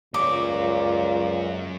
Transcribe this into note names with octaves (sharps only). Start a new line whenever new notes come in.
C#2 F#2 A#2 C#5 D6